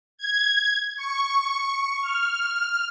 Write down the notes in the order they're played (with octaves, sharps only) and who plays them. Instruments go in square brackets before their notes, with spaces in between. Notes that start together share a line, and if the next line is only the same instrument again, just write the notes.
[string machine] G#6
C#6
F6